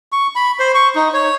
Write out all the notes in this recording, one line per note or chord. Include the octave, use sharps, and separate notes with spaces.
C#6
B5
C5
C#6
D#4
C#5